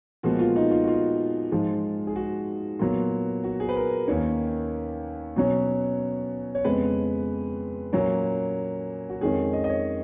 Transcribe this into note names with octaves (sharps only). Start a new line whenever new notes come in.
A#2 F3 G#3 B3 F#4
F4
D#4
F4
F#4
F4
G#2 F3 G#3
G#4
F#4
A#2 F#3 B3
F#4
G#4
B4
A#4
D#2 D#3 A#3 C#4 C#5
B2 F#3 C#4
C#5
F2 C#3 G#3 B3 B4
A#2 F#3 A#3 C#4
F#4
F2 D#3 G#3 C#4 G#4
D#5
D#5
C#5